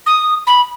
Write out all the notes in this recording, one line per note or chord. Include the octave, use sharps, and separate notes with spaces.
D#6
B5